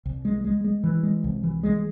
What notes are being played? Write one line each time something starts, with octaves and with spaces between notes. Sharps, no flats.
C2
G#3
G#3
G#3
E3
G#3
C2
E3
G#3